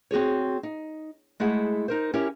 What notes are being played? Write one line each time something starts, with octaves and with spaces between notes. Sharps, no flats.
C4 F#4 G#4 C#5
D#4
G#3 A3 E4 G#4 F#5
D#4 A#4 C5
C#4 E4 G4 A#4 C#5